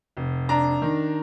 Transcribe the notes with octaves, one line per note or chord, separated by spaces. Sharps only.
F1
D4 A#5
D#3